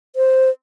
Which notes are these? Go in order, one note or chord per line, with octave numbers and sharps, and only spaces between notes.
C5